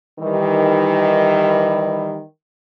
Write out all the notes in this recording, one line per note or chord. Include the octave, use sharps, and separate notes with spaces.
D#3 E3 G3